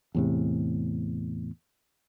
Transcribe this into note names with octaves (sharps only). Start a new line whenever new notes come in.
E2 A2 C3